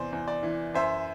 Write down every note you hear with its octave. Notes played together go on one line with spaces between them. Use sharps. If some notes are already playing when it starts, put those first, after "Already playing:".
Already playing: E2 C3 C5 D5
E2
D5
E3
F#2 C5 E5